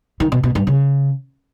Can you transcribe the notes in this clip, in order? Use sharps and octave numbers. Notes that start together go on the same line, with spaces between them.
D#3
B2
B2
G2
C#3